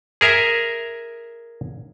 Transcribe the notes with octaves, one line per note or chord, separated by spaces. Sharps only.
G#4 A#4 E5